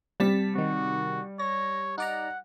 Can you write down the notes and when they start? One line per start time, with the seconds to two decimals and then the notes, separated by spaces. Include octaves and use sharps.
0.20 C3 G3 A5 B6
0.55 C3 D#3 F#4
1.39 C#5 A#6
1.98 D#4 D5 F#5 A#5